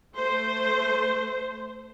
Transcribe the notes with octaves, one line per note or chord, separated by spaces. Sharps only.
A3 C5